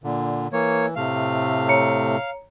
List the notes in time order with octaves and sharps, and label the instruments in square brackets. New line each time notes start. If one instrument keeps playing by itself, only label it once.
[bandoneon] A#2 D3
[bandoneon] E3 [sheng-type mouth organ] A#3 C#5
[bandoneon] A2 C3 A3 [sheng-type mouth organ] F5
[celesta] C#5 A#5 C#7